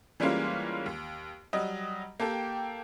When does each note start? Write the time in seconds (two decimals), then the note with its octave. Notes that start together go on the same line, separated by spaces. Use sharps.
0.20 E3 G3 G#3 A#3 C#4 F4
0.86 D#2
1.53 F#3 G3 D#5
2.20 A#3 G4 A4 G5